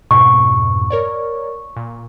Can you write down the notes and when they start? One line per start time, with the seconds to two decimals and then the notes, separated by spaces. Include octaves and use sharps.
0.11 F2 G#2 B2 C#6
0.90 A#4 C#5 D5
1.76 A#2